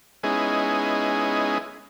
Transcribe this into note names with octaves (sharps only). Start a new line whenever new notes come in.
G#3 B3 C#4 D#4 E4 G#4